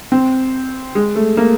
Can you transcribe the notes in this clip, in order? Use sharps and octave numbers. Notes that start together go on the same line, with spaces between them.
C4
G#3
A3
A#3